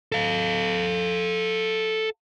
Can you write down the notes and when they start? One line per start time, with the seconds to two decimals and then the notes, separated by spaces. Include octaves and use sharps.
0.12 A4 F5